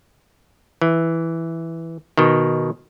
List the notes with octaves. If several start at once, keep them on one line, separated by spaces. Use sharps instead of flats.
E3
B2 D#3